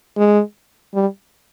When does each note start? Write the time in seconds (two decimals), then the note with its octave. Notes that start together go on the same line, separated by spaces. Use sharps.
0.17 G#3
0.94 G3